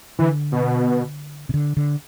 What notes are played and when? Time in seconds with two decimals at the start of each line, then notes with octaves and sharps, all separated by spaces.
0.19 D3 E3
0.52 B2
1.49 C3
1.54 D3
1.77 D3